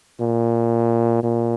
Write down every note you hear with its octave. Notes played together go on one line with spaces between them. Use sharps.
A#2
A#2